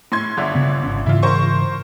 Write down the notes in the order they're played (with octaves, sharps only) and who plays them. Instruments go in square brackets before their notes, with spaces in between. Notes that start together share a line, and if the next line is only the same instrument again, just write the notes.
[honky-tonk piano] A2 C6 G#6
G1 D3 E5
[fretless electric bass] C#3 B3
G#1 C#4
[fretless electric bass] G#2 C#3 E3 [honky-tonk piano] E4 F4
[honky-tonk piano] A#4 C5 C#6